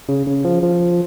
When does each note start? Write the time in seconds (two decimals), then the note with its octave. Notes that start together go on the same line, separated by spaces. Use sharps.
0.09 C#3
0.27 C#3
0.45 F3
0.63 F3